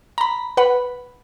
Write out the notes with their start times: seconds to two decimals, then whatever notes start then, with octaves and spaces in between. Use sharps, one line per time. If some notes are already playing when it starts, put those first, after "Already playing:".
0.18 A#5 B5
0.57 B4 F#5 B5